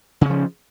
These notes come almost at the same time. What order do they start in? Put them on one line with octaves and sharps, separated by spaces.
C#3 C#4 F3